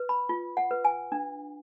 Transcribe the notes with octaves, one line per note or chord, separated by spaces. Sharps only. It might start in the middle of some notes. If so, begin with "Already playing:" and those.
Already playing: B4
B5
F4
F#5
B4
G#5
D4